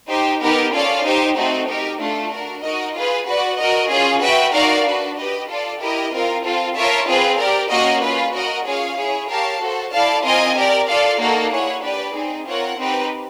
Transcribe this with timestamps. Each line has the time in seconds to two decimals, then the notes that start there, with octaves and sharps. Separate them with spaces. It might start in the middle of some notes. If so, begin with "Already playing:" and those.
0.09 D#4 G4 C5
0.41 B3 D#4 G4 A#4
0.73 C#4 F4 A4 D5 F5
1.05 D#4 G4 C5
1.36 A3 C4 D#4 F#4
1.68 D#4 G4 A#4
1.99 A3 D4 F4 A4
2.31 D4 F#4 A#4
2.63 D#4 F#4 A#4 D#5
2.94 F4 G#4 B4
3.26 F#4 B4 D5 F#5
3.58 F#4 A#4 D#5
3.90 C#4 F4 G#4
4.22 F#4 B4 E5 G5
4.53 D#4 F#4 A#4 D5 F5
4.84 D4 F#4 B4
5.16 G4 B4 D#5
5.49 F4 A4 D5
5.80 E4 G4 A#4 D#5
6.12 C4 F4 A#4
6.44 C4 F4 A4
6.75 F4 A#4 C#5 E5 A5
7.07 C4 F4 G#4 B4
7.38 G4 A#4 D5
7.70 A#3 C#4 F#4 A#4 D#5
8.02 C#4 F4 G#4 B4
8.34 F#4 A#4 D#5 F#5
8.65 C#4 F4 G#4 C#5 F5
8.97 E4 G#4 C#5
9.29 G4 A#4 C#5 F5 A5
9.61 F#4 A4 C5
9.92 E4 A4 D5 F5 A5
10.23 C4 F4 A#4 D#5 G#5
10.55 G4 A#4 D5
10.87 F4 A4 D5 F5
11.19 A#3 D#4 F#4 A4
11.51 E4 G#4 C#5 F#5
11.82 D4 G4 B4 D5
12.14 C4 D#4 G#4
12.46 C4 F4 A#4 C#5 F#5
12.78 C4 D#4 G4 B4